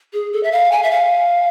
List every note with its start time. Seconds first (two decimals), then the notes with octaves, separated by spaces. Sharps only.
0.13 G#4
0.33 A4
0.43 E5
0.52 F5
0.72 G#5
0.83 E5
0.91 F5